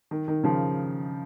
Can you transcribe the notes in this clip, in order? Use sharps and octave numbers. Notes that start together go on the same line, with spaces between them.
D#3
D#3
C#3 F3